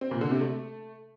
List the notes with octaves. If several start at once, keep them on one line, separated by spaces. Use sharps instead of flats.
C4
A#2
D3
C3
A3